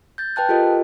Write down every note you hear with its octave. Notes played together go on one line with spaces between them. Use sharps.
G6 A6
B4 G5 A5 F#6
F4 G4 A4 A#4 D#5